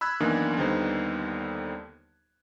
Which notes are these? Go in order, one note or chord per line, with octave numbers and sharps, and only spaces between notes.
B5 E6 F#6 G#6
F#2 D#3 E3 A#3 B3 D4
D#2 D3 G3 B3 D#4 C5